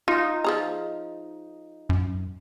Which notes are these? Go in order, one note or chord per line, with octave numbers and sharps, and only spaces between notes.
D#4 F4
F3 G#4 A#5
F#2